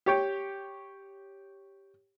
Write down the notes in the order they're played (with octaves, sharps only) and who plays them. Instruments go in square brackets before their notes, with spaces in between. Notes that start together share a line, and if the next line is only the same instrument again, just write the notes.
[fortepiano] G4 C#5 G5